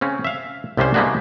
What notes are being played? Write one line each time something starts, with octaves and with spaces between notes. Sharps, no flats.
C#3 C4 C#4
E5 F5
C2 C3 G3 C#4 C5
G3 G#3 A#3 B3 D4 F#4